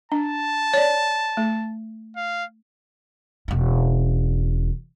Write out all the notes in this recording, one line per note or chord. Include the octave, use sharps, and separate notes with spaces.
D4 A5
C#5 D5
A3
F5
E1 C#4